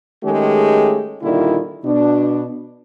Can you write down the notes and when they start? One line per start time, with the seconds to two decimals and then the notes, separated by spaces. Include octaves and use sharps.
0.24 D#3 G#3 A3 C#4 G4 G#4
1.22 A#2 D3 D#3 G3 E4 F4
1.84 B2 D4